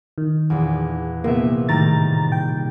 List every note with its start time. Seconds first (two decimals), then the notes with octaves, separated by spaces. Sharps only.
0.18 D#3
0.50 A#1 E2
1.24 A#1 C3 A#3 B3 E5
1.69 A2 D#3 G3 A#5 A6
2.32 G5